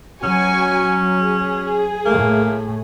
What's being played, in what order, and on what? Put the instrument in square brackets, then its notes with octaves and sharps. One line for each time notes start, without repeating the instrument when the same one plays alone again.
[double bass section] F#3 [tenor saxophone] C#4 [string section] F#4 G#5 C#6
[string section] G#4
[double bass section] A2 A3 [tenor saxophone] A#3